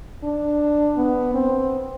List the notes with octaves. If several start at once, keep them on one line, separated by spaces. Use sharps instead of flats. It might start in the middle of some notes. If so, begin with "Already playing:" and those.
D4
B3
C4